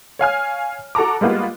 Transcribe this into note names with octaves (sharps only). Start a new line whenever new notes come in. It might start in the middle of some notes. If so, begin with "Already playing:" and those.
C#5 F5 G#5 F6
F#4 A4 A5 A#5 D6
G3 G#3 A#3 B3 F4